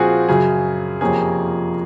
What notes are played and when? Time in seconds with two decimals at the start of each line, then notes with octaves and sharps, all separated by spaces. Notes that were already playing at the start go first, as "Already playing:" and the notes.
Already playing: A#2 F3 C4 F4 F#4 G#4
0.28 F#2 C#3 F#3 G#4
1.01 F2 C3 F3 A#3 C#4 G#4